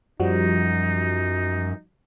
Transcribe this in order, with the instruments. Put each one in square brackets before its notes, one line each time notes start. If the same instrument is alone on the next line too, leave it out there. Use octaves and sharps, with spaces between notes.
[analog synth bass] F#2 [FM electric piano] F3 G3 F#4 [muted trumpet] D#4